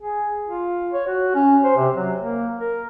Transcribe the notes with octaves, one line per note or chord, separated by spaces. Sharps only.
G#4
F4
C#5
F#4
C#4
C5
C3
F#3
A#3
A#4